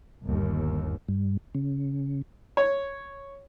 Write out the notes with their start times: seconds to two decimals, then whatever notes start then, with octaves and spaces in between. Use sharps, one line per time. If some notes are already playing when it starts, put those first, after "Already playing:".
0.24 G1 D#2
1.09 G2
1.55 C#3
2.57 C#5